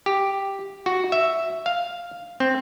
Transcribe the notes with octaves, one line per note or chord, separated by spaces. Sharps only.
G4
F#4
E5
F5
C4